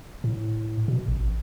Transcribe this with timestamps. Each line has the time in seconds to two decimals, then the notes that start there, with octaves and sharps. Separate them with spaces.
0.24 A2
0.88 B2
1.08 A1